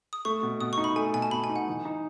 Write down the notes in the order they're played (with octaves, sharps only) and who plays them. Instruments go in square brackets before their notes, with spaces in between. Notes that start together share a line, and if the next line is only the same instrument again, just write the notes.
[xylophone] D#6
[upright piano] A3 [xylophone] C#6
[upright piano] B2
[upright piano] B2 [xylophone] D#6
[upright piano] D#4 [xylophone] C#6
[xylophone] B5
[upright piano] A3 [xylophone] G#5
[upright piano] B2 [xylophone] G#5
[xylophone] A5
[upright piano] B2 [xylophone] B5
[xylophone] G#5
[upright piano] D#4
[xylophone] F#5
[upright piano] E3
D#4